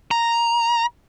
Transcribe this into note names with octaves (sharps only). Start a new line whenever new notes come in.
A#5